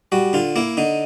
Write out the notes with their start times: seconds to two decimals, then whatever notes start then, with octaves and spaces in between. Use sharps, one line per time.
0.12 G3 F#4
0.33 D3 F4
0.56 A#3 E4
0.77 D3 D#4